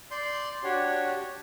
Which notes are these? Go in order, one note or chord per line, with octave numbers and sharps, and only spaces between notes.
D5 C6 G6
D4 F#4 G4 C#5